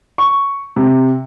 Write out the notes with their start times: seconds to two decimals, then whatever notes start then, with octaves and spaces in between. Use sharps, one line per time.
0.18 C#6
0.76 C3